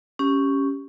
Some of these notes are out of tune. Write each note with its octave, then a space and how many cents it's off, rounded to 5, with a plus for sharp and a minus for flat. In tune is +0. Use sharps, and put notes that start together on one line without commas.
C#4 +0 G4 +0